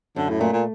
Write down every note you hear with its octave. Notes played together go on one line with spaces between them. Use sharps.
F#2 D3
A2
A#2 A3
A#2